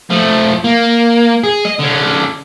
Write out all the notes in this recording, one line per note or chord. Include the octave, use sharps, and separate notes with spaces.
F3 A3
A#3
G#4
D#5
D3 C#4